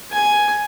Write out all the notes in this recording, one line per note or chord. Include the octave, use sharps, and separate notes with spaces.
G#5